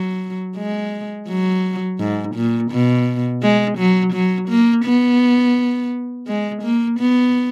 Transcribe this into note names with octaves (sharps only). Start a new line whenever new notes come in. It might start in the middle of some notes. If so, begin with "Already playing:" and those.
Already playing: F#3
G#3
F#3
G#2
A#2
B2
G#3
F#3
F#3
A#3
B3
G#3
A#3
B3